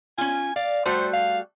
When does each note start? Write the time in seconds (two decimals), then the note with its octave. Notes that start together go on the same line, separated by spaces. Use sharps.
0.18 C#4 F4 G#5
0.56 D5 F5
0.85 G3 A3 F#4 C5
1.13 F5